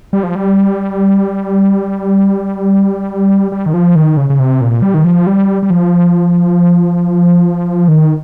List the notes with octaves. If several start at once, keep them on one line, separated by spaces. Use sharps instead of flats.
G3
F3
G3
G3
D#3
F3
D#3
C#3
C#3
C3
A#2
G3
D#3
F3
G3
G3
F3
D#3